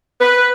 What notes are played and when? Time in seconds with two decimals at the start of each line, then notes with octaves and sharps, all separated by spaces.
0.21 B4